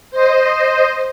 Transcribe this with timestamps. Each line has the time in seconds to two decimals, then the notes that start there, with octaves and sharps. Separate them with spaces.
0.11 C5 D#5